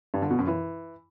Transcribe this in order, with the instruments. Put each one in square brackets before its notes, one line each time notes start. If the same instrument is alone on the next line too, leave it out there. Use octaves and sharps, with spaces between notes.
[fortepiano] G2
D3
B2
F#2
E3